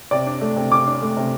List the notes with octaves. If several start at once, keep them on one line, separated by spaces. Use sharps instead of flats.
C3 D5
D4
A3
C3
C3 D6
D4
A3
C3